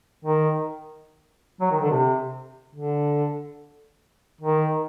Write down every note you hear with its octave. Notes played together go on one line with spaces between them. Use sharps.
D#3
F#3
D#3
D3
C3
D3
D#3